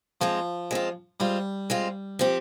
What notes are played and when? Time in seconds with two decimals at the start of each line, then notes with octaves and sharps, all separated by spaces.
0.21 F3 G#3 C4 F4
0.71 G#3 C4 F4
1.20 G3 G#3 C4 F4
1.70 G#3 C4 F4
2.19 F3 C4 G4